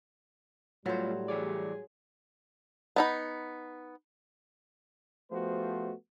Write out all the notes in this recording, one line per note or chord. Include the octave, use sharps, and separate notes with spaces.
A2 F#3 G3 A3 B3 F4 C5
E3 G#4 C#5 D5
B3 D#4 B5
F3 A3 B3 F#4 G4 C5